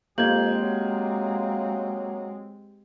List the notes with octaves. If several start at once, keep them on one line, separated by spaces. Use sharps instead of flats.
F2 G#3 A#3 C4 G4 G6 G#6 F#7
F#3